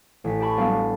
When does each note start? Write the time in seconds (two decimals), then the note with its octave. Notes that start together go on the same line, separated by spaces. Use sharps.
0.24 A1 B6
0.40 G4 A5 B5 C#6
0.57 F#3 G3 B3 D4 B4 F5